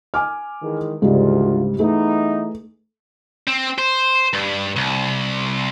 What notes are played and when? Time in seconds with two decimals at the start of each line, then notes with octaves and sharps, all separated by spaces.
0.14 G#5 D6 F6
0.62 D#3 E3 G#3
1.02 D2 G#2 C#3 G3 F4
1.79 E3 A3 B3 D#4 G#4
3.48 C4
3.78 C5
4.33 G2
4.76 C2